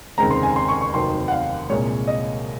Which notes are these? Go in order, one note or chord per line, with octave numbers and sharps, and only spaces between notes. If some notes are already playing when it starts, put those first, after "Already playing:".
F1 D#2 C#3 G#3 C4 A#5
C6
G#5
C6
C#6
C#6
F1 D#2 D#3 F#3 C4 C6
F#5
F5
C2 A#2 G#3 C#5
D#5